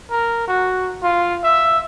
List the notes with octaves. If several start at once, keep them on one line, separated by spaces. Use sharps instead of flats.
A#4
F#4
F4
E5